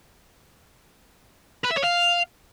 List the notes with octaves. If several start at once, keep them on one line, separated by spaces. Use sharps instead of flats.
B4
E5
C#5
F5